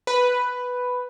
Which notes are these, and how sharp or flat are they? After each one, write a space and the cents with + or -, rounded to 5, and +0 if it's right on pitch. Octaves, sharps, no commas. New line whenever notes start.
B4 +5